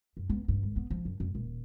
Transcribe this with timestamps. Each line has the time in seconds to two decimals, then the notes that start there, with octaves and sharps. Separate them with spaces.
0.17 F#2
0.30 B3
0.48 G2
0.63 G#1
0.76 B3
0.91 F3
1.05 F#2
1.20 F2
1.35 D#1